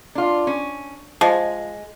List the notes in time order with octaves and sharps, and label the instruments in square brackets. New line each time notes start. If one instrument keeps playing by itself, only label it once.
[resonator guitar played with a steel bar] D4 F4
C#4
[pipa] F3 [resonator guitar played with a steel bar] G#3